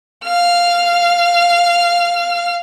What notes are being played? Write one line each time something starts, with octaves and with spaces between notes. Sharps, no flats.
F5 F6